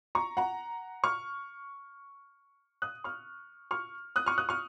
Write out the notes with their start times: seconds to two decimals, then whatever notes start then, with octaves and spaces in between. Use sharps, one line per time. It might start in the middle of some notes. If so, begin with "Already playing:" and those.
0.15 A#5 C#6
0.37 F#5 A#5
1.04 C#6 F6
2.82 D#6 F#6
3.04 C#6 F6
3.71 C#6 F6
4.16 D#6 F#6
4.26 C#6 F6
4.38 D#6 F#6
4.49 C#6 F6